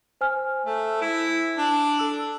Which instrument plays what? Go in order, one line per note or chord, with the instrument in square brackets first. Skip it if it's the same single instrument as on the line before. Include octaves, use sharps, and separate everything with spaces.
[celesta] C5 G#5 F6
[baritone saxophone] A3
E4
D4
[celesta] A4 E6